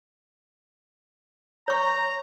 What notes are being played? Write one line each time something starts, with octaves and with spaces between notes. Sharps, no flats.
C#5 A#5 C#6